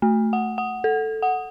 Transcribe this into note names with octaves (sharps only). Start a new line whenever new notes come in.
A3
F#5
F#5
A4
F#5